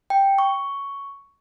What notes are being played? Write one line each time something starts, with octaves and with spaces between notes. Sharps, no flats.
G5
C#6